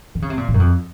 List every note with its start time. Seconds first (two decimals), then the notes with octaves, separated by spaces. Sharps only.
0.15 D#3
0.22 C#3
0.30 C3
0.38 A#2
0.48 A2
0.54 F#2
0.60 F2